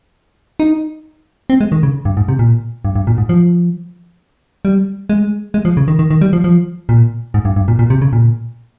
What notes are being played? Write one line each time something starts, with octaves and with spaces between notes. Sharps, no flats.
D#4
C4
G#3
D#3
C#3
G2
G#2
C3
A#2
G2
G2
A#2
G#2
F3
G3
G#3
G#3
F3
C#3
D#3
D#3
D#3
G3
F3
F3
A#2
G#2
G2
G2
A#2
A#2
C3
C#3
A#2